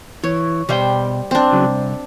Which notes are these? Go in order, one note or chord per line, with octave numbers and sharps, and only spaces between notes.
E3 C#5
B2 G3 C5 E5 G5
C4 D4
C#3 F#3
C2